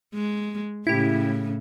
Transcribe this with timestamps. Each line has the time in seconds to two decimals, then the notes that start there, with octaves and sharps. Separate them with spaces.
0.14 G#3
0.87 A2 C#3 E4 G4